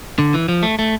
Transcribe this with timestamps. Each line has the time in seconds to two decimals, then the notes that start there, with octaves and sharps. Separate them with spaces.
0.19 D3
0.34 E3
0.49 F3
0.63 A3
0.79 A3